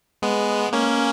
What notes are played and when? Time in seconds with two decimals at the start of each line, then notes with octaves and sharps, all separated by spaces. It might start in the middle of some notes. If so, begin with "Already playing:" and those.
0.22 G#3 B3
0.73 A#3 C#4